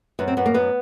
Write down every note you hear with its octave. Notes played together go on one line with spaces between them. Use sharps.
F#2 B3
C4
F#2 B3
A#3
F#2 B3